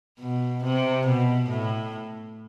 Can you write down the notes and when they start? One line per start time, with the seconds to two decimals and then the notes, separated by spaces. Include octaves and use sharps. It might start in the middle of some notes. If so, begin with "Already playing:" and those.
0.20 B2
0.63 C3
1.07 B2
1.49 A2